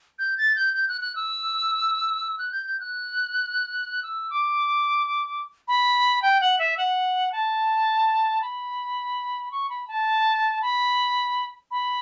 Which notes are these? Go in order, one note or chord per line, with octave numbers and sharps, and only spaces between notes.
G6
A6
G6
G6
F#6
F#6
E6
F#6
G6
G6
F#6
E6
D6
B5
G5
F#5
E5
F#5
A5
B5
C#6
B5
A5
B5
B5